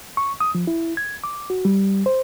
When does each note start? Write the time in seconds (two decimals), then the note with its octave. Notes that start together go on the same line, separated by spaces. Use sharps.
0.17 C#6
0.40 D#6
0.55 F3
0.67 E4
0.97 G#6
1.24 D6
1.50 F#4
1.65 G3
2.06 C5